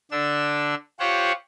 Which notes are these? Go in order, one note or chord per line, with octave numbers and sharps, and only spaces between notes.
D3 D4 E6
F4 G4 C5 C#5 F#5 C#6